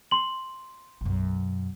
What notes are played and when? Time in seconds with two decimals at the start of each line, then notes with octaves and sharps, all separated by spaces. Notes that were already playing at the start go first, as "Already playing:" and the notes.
0.11 C6 F#7
1.01 B1 F#2